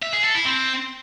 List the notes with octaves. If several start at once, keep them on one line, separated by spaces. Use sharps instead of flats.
E5
G#4
A4
E4
C4